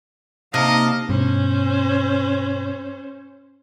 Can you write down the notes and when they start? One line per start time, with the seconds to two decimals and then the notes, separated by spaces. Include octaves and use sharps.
0.54 C3 A#3 D#4 D#5 F5 A5
1.09 G2 B2 C#4 C5